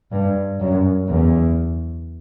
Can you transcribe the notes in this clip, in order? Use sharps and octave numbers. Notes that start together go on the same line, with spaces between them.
G2
F#2
E2